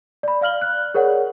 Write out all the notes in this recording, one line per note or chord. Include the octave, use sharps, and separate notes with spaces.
D5 B5
D5 F5 F6 F#7 G7
F#6
G#4 A#4 C#5 D5 F#5